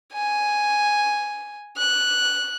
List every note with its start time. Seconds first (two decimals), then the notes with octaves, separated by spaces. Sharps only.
0.13 G#5
1.77 F#6